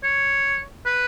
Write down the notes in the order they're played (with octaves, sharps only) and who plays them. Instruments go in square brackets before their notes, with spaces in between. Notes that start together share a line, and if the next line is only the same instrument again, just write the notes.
[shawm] C#5
B4